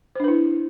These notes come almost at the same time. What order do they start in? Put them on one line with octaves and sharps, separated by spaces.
C5 D4 B4 E4